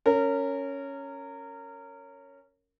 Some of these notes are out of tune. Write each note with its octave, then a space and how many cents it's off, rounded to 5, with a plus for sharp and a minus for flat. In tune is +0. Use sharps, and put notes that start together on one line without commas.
C#4 +0 A#4 -25